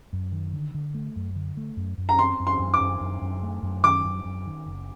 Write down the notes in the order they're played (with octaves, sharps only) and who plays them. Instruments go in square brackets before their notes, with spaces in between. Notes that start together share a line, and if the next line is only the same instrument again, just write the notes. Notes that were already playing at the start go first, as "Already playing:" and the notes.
[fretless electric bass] F#2
D#3
D3
D3
A3
F#2
D3
A3
F#2
F#2
[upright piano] A#5
[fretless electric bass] C4 [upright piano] C6
[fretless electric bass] F#2
[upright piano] C6
[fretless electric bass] F#2
[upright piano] D6
[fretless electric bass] F#2
F#2
F#2
A3
F#2
[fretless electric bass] D#3 [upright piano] D6
[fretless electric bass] F#2
F#2
D#3
F#1